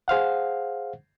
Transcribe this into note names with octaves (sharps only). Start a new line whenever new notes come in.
G#4 C5 F5 F#5